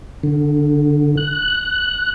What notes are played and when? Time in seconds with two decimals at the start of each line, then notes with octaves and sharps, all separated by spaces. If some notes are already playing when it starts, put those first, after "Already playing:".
0.23 D3
1.17 F#6